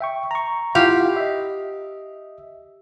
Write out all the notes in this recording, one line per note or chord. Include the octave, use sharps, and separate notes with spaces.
E5 G5 C#6
A#5 C#6
E4 F4 G4 F5 F#5
D#5 E5